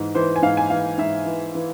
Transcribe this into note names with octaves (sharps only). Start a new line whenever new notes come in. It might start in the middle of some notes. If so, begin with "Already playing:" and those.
Already playing: G#2 E3
E3 C5
G#5
G#2 F5
G#5
E3 F5
G#2 E5
E3
E3